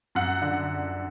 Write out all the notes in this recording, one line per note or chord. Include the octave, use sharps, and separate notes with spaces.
F#2 F#5
D3